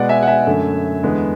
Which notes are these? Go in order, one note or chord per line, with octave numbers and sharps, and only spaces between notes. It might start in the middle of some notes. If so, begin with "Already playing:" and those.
Already playing: B2 G#3 B3 D5 F#5
E5 G#5
F#5
E5 G#5
F#2 D3 A3
E2 D3 G#3 B3